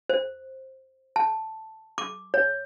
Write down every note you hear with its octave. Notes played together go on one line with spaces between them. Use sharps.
C5
A5
D6
C#5